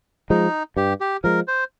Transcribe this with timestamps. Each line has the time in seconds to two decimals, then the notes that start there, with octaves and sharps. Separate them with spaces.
0.30 F3 G#3 D#4
0.77 G2 G4
1.00 G4
1.24 F3 G#3 A#4
1.48 C5